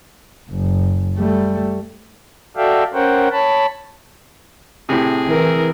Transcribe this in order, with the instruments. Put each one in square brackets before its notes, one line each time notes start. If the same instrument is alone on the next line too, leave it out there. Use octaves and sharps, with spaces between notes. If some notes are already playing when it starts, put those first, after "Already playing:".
[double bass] F#1
G3 A3
[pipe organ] F#4 A4 D5 E5 F5 G5
C#4 A#4 C5 C#5 F#5 G5
C#5 A5 B5
[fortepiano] A2 C3 [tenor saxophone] G#4
[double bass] E3 [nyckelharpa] A#4